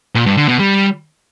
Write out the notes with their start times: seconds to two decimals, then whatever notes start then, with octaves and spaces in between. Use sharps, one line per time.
0.15 A#2
0.26 G2
0.37 D3
0.48 B2
0.59 G3